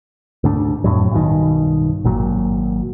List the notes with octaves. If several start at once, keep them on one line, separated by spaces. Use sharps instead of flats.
D2 G#2 D4
F2 A2 F#3
B1 G2 B2 D#3
G#1 A#2 F#3